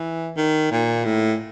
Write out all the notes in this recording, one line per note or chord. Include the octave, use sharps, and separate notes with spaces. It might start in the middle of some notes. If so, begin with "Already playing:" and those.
Already playing: E3
D#3
A#2
A2